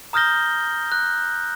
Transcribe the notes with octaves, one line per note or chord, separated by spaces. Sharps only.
A#5 D#6 F6 G6 A#6 G7
F#6